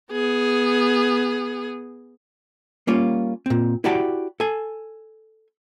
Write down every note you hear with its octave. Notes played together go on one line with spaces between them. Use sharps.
B3 G#4
G3 A#3 C#4 F4
A#2 C4
E4 F#4 G4 D5 F#5 A5
A4 G#5